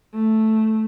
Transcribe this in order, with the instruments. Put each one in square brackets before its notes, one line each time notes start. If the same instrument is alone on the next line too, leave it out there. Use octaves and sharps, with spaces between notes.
[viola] A3